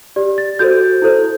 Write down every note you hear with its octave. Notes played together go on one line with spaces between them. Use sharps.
G4 D5
A6
F#4 A4 C5 G6
E4 A4 C5